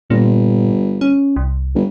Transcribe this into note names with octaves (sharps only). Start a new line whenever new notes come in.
G1 A#2
C#4
C2
G1